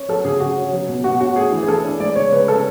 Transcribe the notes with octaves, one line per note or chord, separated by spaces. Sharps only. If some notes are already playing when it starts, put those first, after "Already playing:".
Already playing: C#4
F#3 A4
C#3 G#4
C#3 F#4
C#4
F#3
B2
B2 F#4
C#4 F#4
A3 G#4
E3
G#4
E3 A4
D4
G#3 D5
C#3 C#5
C#3 B4
C#4 A4